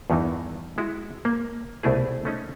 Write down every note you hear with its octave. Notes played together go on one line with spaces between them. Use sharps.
E2 G2 D#3 E3 D#4
G#3 E4 F#4
A#3
C2 B2 A3 E4 G#4
A3 C#4 D#4